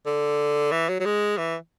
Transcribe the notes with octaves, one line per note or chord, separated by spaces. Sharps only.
D3
E3
F#3
F#3
G#3
E3